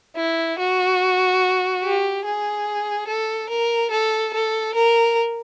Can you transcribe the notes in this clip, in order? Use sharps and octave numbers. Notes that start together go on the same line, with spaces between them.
E4
F#4
G4
G#4
A4
A#4
A4
A4
A#4